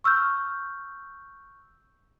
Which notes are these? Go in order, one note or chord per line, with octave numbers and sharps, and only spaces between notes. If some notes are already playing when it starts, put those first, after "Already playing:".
C#6 E6 F6 G6